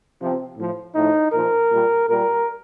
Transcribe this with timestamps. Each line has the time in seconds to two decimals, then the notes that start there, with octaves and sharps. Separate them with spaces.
0.20 C3 F3
0.57 A2 F3
0.95 A2 F3 D#4
1.32 A#2 F3 A#4
1.71 A#2 G3
2.08 A#2 G3 A#4